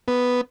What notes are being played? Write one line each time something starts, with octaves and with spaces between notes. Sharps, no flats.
B3